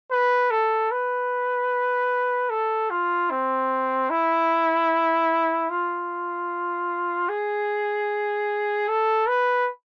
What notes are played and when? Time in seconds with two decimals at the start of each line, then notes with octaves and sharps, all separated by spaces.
0.11 B4
0.51 A4
0.91 B4
2.50 A4
2.90 F4
3.30 C4
4.10 E4
5.70 F4
7.29 G#4
8.88 A4
9.28 B4